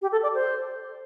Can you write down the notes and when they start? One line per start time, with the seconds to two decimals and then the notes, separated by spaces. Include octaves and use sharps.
0.02 G4
0.12 A4
0.23 D5
0.35 C5